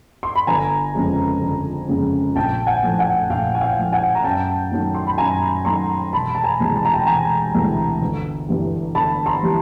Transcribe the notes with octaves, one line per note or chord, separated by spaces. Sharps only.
C6
B5
G1 G#5 A#5
F2 C#3 F3 G#3
G1
F2 C#3 F3 G#3
A#1 G5 A5
F#5 G#5
A2 F3 A3
F#5 G#5
A#1 F5 G5
G#5
F5 G5
A2 F3 A3
F#5 G#5
A#5
F#2 G5 A5
D#3 F#3 A3
C6
B5
F#2 G#5 A#5
D#3 F#3 A3 A#5 C6
E1 A5 B5
A5
G#5 A#5
D2 C3 E3 G#3
A5
A#5
G5 A5
E1 G#5 A#5
D2 C3 E3 G#3
G1
G2 E3 G3
G1 A5 B5
A#5 C6
E3 G3